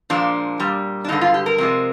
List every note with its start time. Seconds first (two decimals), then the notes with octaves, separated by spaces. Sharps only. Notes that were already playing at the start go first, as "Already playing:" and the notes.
0.10 A#2 F3 G#3 D4
0.60 A#2 G3
1.05 D4
1.09 G2 D3 G#3 D#4
1.21 F4
1.34 G4
1.46 A#4
1.58 C3 F3 G#3